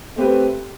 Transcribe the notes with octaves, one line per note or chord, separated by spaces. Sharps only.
A3 C4 G4 B4